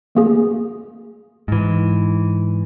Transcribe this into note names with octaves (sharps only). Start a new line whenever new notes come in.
A3 A#3 G#4
G#2 E3